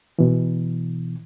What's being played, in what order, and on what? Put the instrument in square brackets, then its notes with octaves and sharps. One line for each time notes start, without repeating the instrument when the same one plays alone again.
[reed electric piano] B2 E3